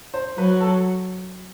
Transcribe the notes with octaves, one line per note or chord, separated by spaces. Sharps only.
C5
F#3 B4
A4